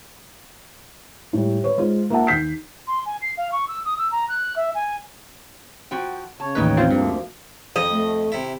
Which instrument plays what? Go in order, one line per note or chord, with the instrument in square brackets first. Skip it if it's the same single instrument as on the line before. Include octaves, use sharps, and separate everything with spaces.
[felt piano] A2 G3
B4 C#5
G#3 F4 C5
A#3 F4 E5 F#5 A5
D#2 G6 B6 C7
[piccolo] C6
G#5
C7
F5
C#6
E6
D#6
E6
A#5
F#6
E5
G#5
[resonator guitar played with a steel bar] F3 F#4 G5
[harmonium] C#3 C#5 [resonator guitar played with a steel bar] A5
[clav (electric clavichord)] A1 D#2 B4 [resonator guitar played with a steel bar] A#4 D#5 G5
[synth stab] C4 F4
[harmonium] D2 F3 A#3 [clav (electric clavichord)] G2
[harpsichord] F2 [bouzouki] D#5
[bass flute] A3
[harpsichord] C3 E4